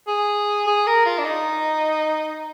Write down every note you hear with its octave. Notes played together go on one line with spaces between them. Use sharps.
G#4
G#4
A#4
F4
D4
D#4